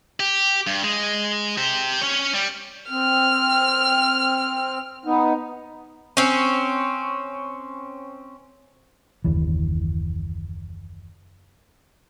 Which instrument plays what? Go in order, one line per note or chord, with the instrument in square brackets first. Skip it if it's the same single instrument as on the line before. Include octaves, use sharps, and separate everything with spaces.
[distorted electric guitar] G4
G2
G#3
G4 C5
C#4 C#5
G3
[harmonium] C4 [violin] F6
[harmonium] B3 D#4
[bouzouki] C4 C#4
[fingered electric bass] F#1 D#2 E3